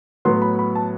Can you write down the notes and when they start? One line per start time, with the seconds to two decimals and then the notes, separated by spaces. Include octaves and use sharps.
0.25 A2 F#3 B3 C6
0.42 B5
0.59 B5
0.75 A5